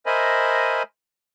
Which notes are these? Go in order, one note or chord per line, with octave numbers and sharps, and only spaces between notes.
A#4 C5 D#5 E5 G#5 B5